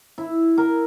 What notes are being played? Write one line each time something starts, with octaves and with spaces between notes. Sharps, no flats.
E4
A#4